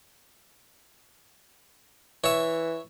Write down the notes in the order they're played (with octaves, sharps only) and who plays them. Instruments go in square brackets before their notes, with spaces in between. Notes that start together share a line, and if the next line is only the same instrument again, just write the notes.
[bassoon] E3 [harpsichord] C#5 E5